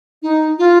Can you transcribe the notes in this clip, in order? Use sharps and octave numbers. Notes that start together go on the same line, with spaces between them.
D#4
F4